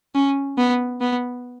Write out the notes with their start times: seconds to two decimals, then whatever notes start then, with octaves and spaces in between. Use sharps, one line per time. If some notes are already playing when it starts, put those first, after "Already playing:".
0.15 C#4
0.58 B3
1.01 B3